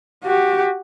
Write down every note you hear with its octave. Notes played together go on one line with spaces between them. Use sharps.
F#4 G4